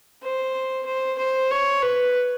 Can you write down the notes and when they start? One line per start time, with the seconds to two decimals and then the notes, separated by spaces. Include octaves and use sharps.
0.23 C5
0.86 C5
1.18 C5
1.51 C#5
1.82 B4